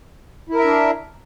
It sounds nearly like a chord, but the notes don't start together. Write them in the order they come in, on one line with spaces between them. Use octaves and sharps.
E4 A#4 E5 D4